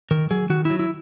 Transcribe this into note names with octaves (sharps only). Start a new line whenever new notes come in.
D#3 A#4
F#3 G#4
D#3 F#4
F#3 E4
E4